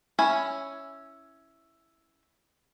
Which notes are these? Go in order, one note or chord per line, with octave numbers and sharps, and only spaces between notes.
C#4 E4 G#5